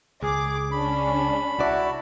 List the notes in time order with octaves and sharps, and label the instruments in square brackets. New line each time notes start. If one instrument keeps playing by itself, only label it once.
[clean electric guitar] C#2 [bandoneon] G#4 [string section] D6
[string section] C#4 D4 G#4 [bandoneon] B5
[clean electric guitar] C2 D5 [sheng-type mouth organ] E4 F#4 A5